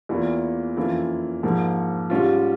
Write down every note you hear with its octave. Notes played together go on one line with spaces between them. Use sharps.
E2 E3 A#3 F4
F2 E3 A#3 C#4 F4
G#2 F3 A#3
G#2 G3 C#4 F4